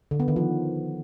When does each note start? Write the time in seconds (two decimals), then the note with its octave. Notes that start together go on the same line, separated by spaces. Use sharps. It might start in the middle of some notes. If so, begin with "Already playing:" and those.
0.11 D3
0.20 B3
0.28 D#3
0.36 F3